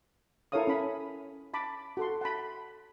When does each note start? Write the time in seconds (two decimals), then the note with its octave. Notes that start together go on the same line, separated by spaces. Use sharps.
0.52 E4 A4 A#4 C#5 F5 D#6
0.67 C#4 B5
1.54 A5 B5 D6
1.97 F#4 A4 C6
2.21 F#5 A5 B5